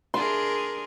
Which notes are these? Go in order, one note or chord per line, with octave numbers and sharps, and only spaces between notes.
D4 G#4 A#4 C6